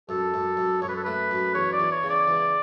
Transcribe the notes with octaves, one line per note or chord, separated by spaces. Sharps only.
F#2 A4
F#2
F#2
F#2 C#5
B4
A4
A3 B4
F#2
E2 C#5
D5
E2
C#5
C#3
D5
E2